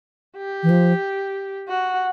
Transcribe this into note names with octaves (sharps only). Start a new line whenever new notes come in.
G4
E3
F3
F#4